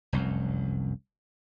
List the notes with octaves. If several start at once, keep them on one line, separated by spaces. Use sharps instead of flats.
F1 C2 F#2